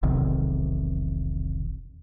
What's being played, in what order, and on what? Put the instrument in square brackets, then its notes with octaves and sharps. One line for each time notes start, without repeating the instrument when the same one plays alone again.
[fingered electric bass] E1 B1 C3 D#3